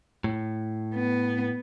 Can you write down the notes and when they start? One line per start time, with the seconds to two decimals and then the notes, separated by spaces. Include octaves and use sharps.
0.24 A2
0.95 B3